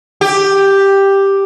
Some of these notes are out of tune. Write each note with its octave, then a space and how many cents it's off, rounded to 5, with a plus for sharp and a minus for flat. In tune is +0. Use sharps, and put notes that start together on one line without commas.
G4 +5